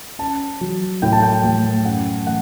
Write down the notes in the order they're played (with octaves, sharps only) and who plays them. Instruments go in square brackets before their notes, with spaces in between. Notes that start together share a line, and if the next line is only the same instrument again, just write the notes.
[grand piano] C#4 A5
F#3
A2 G5
A5
G5
A3
F#2 F#5
A3 F#5